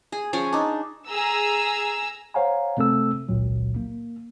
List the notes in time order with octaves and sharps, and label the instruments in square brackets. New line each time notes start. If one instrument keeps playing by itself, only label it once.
[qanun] G#4
F3 C#4 G#4 C#5
D4 D#4
[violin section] G#4 A#5 E6
[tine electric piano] C5 C#5 F5 F#5 G#5 A#5
C3 A3 C4 A4 E6
G#1 C#2 A#2 F#3
A#3